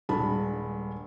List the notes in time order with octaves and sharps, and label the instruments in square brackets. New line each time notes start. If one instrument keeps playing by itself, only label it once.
[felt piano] D#1 G2 G#3 A5 B5